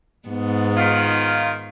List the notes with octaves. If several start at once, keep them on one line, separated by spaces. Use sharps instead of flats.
G#2 B3
D#3 F4